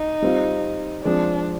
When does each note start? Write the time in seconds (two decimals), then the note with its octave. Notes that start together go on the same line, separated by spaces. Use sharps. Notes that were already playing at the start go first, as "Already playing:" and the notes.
Already playing: D#4
0.22 G3 C4 F4
1.04 F3 G#3 C4 D4